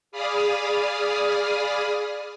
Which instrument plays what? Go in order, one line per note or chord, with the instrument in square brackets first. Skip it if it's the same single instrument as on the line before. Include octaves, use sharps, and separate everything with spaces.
[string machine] G#4 D5 F5 B5 D#6 F6